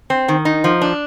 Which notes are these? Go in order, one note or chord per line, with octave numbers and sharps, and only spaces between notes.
C4
D#3
D#4
F3
D4